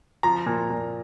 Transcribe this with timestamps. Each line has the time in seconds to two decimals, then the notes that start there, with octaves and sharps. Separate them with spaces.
0.23 F3 A#5
0.46 A#2
0.70 A#2